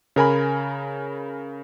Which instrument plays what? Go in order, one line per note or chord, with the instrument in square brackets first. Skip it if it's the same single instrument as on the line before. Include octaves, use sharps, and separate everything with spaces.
[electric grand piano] C#3 A#4 G#5 B5